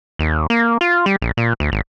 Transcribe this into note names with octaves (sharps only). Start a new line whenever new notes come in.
D#2
A#3
F4
G3
A#1
A#2
D2
G#1